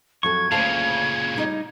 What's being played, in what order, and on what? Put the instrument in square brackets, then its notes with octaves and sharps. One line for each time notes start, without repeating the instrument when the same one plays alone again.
[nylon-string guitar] F2 F#3 A4 [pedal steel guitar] C#6 [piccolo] G#6
[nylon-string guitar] D2 C5 A5 [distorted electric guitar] A#2 C#3 [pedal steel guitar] F5
[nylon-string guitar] G3 D#4 D#5